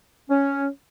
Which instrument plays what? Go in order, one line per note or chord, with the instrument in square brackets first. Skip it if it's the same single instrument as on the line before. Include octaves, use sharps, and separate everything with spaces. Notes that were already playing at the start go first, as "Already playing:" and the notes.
[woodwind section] C#4